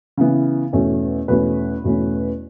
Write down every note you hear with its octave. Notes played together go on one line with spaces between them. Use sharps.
C#3 E3 B3
E2 B2 A3 C#4
E2 B2 A3 C#4 B4
E2 B2 A3 C#4